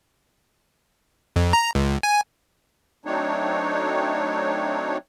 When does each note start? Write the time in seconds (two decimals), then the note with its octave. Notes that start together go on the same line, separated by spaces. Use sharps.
1.36 F2
1.53 A#5
1.75 C#2
2.03 G#5
3.05 F#3 A3 C4 D4 D#4 C#5